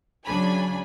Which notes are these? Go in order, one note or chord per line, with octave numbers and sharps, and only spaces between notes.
C#2 C#3 F#3 D4 G#5 B5